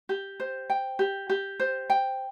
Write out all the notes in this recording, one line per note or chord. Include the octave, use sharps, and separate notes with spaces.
G4
C5
G5
G4
G4
C5
G5